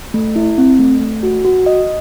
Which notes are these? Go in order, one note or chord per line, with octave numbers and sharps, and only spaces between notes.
A3
E4
C4
A3
A3
F#4
F#4
D#5